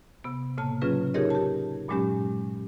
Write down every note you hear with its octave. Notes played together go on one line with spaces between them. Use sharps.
C3 B3
A2 C#3 A#3 A5
C#3 F#3 C#4 F4 G#4 B4
D#4 G4 G#4 A#4 C#5 D#5
G4 A5
G2 A#2 F#3 G#3 C#4 G4